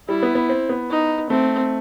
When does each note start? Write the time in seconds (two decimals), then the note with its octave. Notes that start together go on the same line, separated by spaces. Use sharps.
0.08 G3 E4
0.23 B3
0.35 B3
0.49 C4
0.69 B3
0.90 D#4
1.30 A3 C4